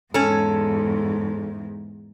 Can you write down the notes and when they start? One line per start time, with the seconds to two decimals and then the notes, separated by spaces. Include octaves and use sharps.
0.14 E2 G#2 C#4 A4